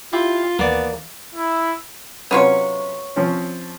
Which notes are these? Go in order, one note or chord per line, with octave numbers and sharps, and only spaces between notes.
E4 F4 G4
D#2 E3 A#3 B3 D5
E4
C3 F#3 B3 C#4 F4 C#5
F3 C4 C#4